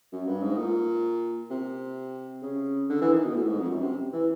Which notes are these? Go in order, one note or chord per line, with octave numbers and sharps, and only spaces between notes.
F#2
G2
G#2
A#2
C3
C#3
D3
E3
D#3
B2
A2
G#2
F2
F#2
C3
E3